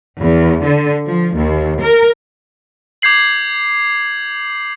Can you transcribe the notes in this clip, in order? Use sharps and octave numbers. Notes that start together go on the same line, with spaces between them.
E2
D3
F3
D#2
A#4
D6 G6 G#6 C7 F#7